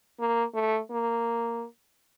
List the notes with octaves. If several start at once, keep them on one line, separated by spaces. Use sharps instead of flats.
A#3
A3
A#3